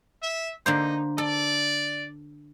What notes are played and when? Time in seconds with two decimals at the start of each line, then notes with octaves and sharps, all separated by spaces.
0.22 E5
0.66 D3 A#3 D#4 C5
1.18 A4 D5